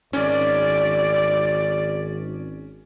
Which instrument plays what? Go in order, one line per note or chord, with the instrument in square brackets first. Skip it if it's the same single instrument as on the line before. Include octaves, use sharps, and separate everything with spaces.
[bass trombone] G#1 [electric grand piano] C#4 [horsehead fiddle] D5